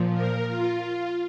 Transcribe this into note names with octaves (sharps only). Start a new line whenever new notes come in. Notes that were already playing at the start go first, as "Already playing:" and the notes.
Already playing: A#2 F3
A#4
F4